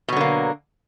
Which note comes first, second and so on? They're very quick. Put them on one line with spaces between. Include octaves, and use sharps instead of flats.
B2 F#3 D3 A#3